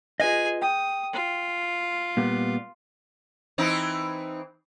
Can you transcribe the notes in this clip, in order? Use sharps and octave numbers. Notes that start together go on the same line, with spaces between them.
F4 G#4 B4 D#5 G#5
G5 D#6
F4
A#2 G3 B3
E3 C4 D#4